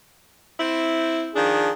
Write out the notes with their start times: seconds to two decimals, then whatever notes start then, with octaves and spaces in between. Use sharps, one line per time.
0.59 C4 E4
1.35 D#3 F3 D4 G#4